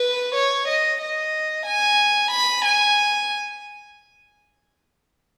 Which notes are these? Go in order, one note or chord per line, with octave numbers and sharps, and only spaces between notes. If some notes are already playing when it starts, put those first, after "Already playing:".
Already playing: B4
C#5
D#5
D#5
G#5
B5
G#5